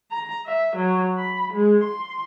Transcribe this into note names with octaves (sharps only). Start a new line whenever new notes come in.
A#5
E5
F#3
B5
G#3
C6